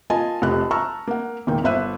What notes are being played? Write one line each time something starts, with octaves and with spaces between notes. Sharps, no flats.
A#3 F4 D#5 G#5 A5
F1 F2 G4 A5 F#6
A5 A#5 C#6 E6 F6
A#3 F#5
E1 A#2 D#3 A#3 G5
G1 C5 E5 E6 F#6 D#7